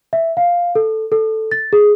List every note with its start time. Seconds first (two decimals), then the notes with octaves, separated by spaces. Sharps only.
0.13 E5
0.37 F5
0.75 A4
1.12 A4
1.52 A6
1.73 G#4